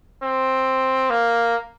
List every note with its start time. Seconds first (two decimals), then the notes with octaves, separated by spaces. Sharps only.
0.23 C4
1.10 A#3